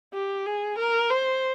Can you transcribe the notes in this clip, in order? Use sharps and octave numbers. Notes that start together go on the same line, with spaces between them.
G4
G#4
A#4
C5